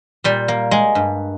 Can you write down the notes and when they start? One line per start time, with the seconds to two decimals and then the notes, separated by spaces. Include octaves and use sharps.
0.24 A#2 G3
0.48 A#3
0.71 G#3
0.95 G2